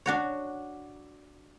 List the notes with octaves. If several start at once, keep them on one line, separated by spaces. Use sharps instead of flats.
D4 F#4 C#5